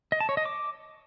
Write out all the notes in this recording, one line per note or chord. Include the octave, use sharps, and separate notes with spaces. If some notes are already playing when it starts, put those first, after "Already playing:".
D#5
A5
C#5
D#5
D6